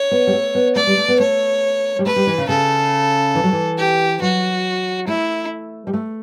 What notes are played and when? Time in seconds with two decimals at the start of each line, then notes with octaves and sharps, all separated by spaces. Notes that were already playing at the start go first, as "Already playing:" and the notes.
Already playing: C#5
0.11 B3
0.27 G3
0.33 A3
0.55 B3
0.76 A3 D5
0.87 G3
0.97 A3
1.08 B3
1.19 A3 C#5
1.99 G3
2.06 A3 B4
2.16 G3
2.27 E3
2.38 C#3
2.49 C#3 A4
3.35 E3
3.44 F#3
3.53 E3
3.78 G4
4.22 F#3 F#4
5.07 A3 E4
5.87 G3
5.94 A3